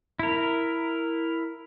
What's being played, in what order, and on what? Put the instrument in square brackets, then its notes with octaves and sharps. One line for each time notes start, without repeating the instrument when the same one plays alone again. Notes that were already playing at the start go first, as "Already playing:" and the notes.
[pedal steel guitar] E4 A#4